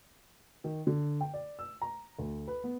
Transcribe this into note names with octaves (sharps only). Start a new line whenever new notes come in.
D#3
D3
G5
D5
E6
A#5
D2
B4
B3